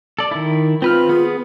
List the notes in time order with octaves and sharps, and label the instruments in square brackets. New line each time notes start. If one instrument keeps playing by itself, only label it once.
[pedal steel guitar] A4 D5
D#3 E4
[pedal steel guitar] C4 B4 F6 [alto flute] F4
[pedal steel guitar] B3 G#4